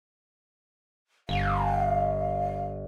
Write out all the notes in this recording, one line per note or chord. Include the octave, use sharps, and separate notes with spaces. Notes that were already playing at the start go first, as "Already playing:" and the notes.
G1 F5